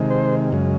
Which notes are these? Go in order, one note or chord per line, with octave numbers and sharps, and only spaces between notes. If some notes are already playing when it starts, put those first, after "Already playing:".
Already playing: C3 D#3 G#3
C5
F#2 C#3 G#3